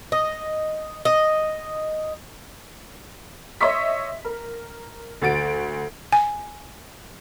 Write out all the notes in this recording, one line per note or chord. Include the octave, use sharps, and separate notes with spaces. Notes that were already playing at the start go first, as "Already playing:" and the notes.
D#5
D#5
C#5 D#5 E5 C6 C#6 B6
A#4
D2 F#4 A6 D7
G#5